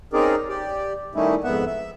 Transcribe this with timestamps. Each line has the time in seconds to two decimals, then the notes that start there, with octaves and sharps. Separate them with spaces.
0.13 C4 C#4 D#4 G#4 A#4 D5
0.49 G4 D5
1.15 D#3 G3 A3 C#4 D#4 E4
1.44 F2 G#2 B3 E5 F#5
1.66 E5